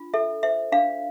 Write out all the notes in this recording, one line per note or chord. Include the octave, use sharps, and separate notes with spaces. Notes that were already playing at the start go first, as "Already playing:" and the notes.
Already playing: D4 F4
A4 E5
C5 E5
D4 F5